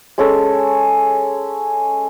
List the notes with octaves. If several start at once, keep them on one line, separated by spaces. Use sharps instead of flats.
G#3 C#4 A4